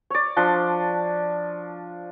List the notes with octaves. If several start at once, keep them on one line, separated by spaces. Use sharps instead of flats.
C#5 D5
F3 D4 C6